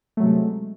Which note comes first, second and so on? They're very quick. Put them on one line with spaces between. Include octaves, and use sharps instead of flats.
A3 F#3 C3 G#3